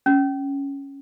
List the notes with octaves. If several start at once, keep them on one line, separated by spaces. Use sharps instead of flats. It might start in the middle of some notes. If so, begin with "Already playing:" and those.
C#4